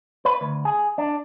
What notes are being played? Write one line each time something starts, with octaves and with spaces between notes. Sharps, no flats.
B4
D2
G#4
D4